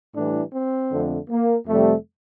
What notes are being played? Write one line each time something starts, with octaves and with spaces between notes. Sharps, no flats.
A2 E3 G3 D4
C4
F2 D3 A3
A#3
F2 C3 G3 A3